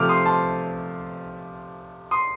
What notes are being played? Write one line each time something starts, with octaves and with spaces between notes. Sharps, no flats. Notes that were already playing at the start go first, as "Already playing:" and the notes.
Already playing: C3 F3 A3 D6 F6
C6 D#6
A5 C6
C6 D#6